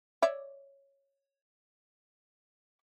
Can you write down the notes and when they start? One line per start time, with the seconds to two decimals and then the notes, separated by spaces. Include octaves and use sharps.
0.22 C#5 D5 E5